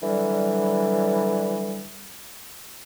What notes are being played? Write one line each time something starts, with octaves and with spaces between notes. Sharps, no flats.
D3 E3 F#3 G3